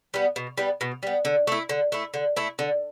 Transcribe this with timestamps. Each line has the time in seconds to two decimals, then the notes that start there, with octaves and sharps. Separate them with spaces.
0.14 G3 B3
0.36 B2
0.58 G3 B3
0.81 B2
1.03 G3 B3
1.25 D3
1.47 A3 E4
1.69 D3
1.92 A3 E4
2.14 D3
2.36 A3 E4
2.59 D3